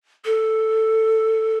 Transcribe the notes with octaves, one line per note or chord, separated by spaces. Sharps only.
A4